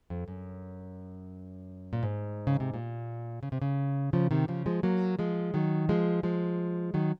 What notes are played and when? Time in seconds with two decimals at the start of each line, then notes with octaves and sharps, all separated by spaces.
0.10 F2
0.28 F#2
1.93 A#2
2.03 G#2
2.47 C#3
2.60 C3
2.74 A#2
3.43 C#3
3.52 C3
3.62 C#3
4.13 C#3 F3
4.31 C3 D#3
4.48 C#3 F3
4.66 F3 G#3
4.83 F#3 A#3
5.19 F3 G#3
5.54 D#3 F#3
5.89 F3 G#3
6.23 F3 G#3
6.94 D#3 F#3